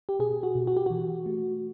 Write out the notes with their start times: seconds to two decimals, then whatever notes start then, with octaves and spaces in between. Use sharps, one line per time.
0.09 G4
0.19 B2 G#4
0.43 F#4
0.55 B2
0.67 F#4
0.77 G4
0.86 E3 F#4
1.26 A3